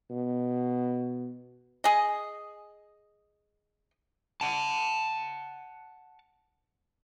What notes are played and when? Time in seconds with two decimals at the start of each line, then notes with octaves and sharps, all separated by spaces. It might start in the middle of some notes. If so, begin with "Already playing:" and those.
0.11 B2
1.84 G#4 D#5
4.41 F#5 A5